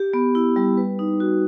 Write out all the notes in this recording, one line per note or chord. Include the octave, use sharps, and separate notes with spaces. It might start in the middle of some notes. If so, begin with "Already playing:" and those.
Already playing: G4
B3
E4
G3
B4
D#4
F#4